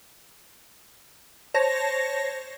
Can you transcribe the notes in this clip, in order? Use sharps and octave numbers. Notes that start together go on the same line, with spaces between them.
C5 C#5 A5 A#6